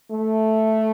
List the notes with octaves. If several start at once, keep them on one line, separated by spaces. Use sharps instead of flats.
A3